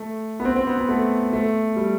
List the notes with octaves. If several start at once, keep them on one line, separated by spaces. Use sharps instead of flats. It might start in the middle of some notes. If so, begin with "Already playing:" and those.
Already playing: A3
B3
C4
C4
B3
B3
A3
A3
G3